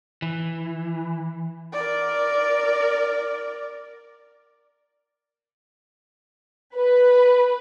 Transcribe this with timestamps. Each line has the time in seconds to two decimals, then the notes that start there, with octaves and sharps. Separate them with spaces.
0.22 E3
1.73 A#4 D5
6.74 B4